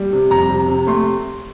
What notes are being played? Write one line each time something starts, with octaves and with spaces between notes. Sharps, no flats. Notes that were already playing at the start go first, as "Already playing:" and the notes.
Already playing: G3
C3
F2 A#5
C3
C3
A3 C6